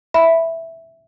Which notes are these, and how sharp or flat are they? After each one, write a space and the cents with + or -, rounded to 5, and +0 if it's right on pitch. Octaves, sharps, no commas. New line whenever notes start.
E5 +0 B5 +0